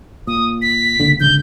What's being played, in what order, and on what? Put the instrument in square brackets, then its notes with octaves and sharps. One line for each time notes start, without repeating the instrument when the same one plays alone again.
[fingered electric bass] A#2 [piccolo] D#6
[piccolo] B6
[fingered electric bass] C#2 A#2 D3
[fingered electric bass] G#1 C#2 D3 [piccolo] G6